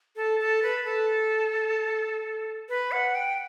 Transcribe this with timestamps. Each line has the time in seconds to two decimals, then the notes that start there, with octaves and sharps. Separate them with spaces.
0.16 A4
0.40 A4
0.63 B4
0.85 A4
2.69 B4
2.92 F#5
3.15 G5